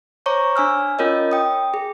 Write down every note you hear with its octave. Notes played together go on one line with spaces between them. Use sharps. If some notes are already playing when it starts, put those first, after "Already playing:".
C5 C#5 A#5 C#6 D6
D4 G#5 E6 F6
C#4 F4 A#4 C#5 D#5
G5 D#6
G#4